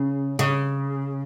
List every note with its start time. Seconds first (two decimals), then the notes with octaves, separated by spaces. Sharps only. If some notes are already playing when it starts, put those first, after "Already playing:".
Already playing: C#3
0.39 C#3